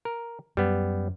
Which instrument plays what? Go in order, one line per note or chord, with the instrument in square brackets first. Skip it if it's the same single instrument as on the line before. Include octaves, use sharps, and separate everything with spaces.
[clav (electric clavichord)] A#4
[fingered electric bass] F#2 [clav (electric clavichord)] G3 B3